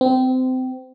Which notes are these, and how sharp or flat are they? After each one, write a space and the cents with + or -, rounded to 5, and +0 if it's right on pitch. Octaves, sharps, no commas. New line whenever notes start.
C4 -25